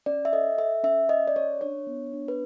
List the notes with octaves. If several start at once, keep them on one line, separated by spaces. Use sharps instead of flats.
C#4 D5
E5
A4 D#5
A4 E5
C#4 E5
C#4 D#5
D5
C#4 C#5
D4 C#5
B3
D4
B4